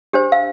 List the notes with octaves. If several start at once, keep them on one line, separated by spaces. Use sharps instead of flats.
D4 G4 C5
F5